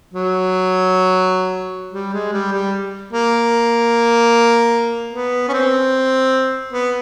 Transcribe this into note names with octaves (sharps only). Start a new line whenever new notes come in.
F#3
G3
G#3
G3
G3
A#3
B3
C#4
C4
B3